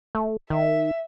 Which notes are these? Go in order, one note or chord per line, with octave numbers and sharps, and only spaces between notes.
A3
D#3 E5